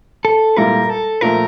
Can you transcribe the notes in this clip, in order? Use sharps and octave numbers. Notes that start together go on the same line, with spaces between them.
A4
A#2 G3 A#3 E4 A4 A#4
A4
A#2 F3 A3 A#4